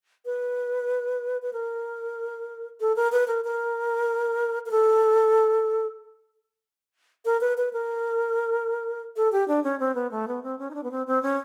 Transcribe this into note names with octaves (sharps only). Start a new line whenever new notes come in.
B4
B4
A#4
A4
A#4
B4
A#4
A#4
A#4
A4
A#4
B4
B4
A#4
A4
G4
D4
C#4
C4
B3
A3
B3
C4
C#4
D#4
D4
B3
C4
C4
C#4